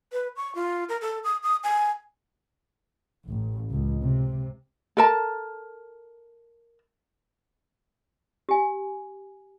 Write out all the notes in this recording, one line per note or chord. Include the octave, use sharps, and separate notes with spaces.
B4
C#6
F4
A#4
A4
D#6
D#6
G#5
A1
C#2
C3
A4 A#4 A5
G4 G#5